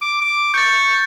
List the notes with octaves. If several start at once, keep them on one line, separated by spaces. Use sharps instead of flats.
D6
D6
C#6 G6 A6